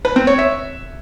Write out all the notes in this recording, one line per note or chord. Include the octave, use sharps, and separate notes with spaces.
B4
C4
C#5
E5